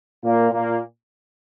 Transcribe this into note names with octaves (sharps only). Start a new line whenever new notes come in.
A#2 A#3
A#2 A#3